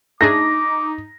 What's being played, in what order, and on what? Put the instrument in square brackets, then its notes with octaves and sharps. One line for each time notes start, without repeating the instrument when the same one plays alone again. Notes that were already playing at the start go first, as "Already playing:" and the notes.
[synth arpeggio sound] A3 D4 G#4 [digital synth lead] D#4 [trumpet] D6 [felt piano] A#6